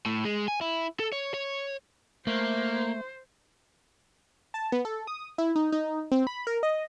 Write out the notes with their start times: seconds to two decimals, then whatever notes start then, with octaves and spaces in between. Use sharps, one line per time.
0.06 A2
0.25 G#3
0.48 G#5
0.61 E4
1.00 A4
1.12 C#5
1.34 C#5
2.27 A3 A#3 C5
4.54 A5
4.72 B3
4.85 A4
5.07 D#6
5.38 E4
5.56 D#4
5.72 D#4
6.12 C4
6.27 B5
6.47 A#4
6.63 D#5